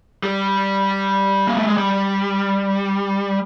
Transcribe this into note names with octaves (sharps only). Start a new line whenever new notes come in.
G3
A#3
A3
G#3
G3